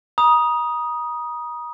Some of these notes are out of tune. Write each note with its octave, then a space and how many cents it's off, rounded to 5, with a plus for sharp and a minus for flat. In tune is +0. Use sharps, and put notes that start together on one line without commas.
A#5 +40 D#6 +0